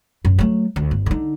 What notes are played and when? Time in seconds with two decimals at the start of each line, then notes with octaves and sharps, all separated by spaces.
0.25 F#2
0.39 F#3 A3
0.76 D2
0.91 G1
1.06 D3 D#4